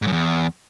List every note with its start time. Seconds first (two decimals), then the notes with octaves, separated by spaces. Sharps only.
0.02 G#2
0.07 F#2
0.12 E2